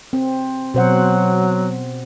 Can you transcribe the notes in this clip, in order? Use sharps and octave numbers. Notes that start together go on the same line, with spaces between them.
C4
B2 F#3 C5 F#5